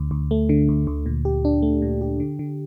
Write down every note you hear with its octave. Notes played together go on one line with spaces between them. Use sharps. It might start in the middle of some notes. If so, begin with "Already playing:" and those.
Already playing: D2
D2
A3
D3
D2
D2
A#2
G4
D4
A3
A#2
G4
D3
D3